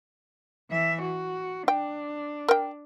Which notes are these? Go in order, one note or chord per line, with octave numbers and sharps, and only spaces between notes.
E3 E5
F#4
D4 G5
A#4 G5